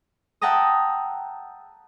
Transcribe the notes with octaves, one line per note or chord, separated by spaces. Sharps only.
E5 F#5 G5 A5 A#5 D#6